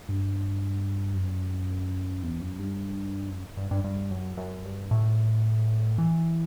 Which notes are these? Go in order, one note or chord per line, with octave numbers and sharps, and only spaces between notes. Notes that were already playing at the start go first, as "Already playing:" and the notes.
G2
F#2
E2
F#2
G2
F#2
G2
G2
G2
F#2
F#2
G2
A2
E3